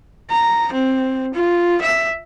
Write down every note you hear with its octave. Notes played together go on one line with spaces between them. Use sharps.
A#5
C4
F4
E5